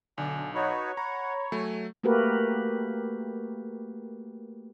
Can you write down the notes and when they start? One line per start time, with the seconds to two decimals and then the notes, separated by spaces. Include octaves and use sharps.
0.18 B1 D3 D4 G#5
0.54 D#4 F#4 B4 C#5 B5
0.97 F#5 A#5 B5
1.52 F#3 A3 G#5
2.04 A3 A#3 F#4 G4 A#4 B4